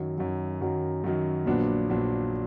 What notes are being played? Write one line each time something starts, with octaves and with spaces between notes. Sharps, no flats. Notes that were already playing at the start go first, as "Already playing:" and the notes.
Already playing: F#2 D#3 F#3
F#2 D#3 F#3
F#2 D#3 F#3
F#2 D#3 F#3
A#1 A#2 F#3 B3 D4
A#1 A#2 F#3 B3 D4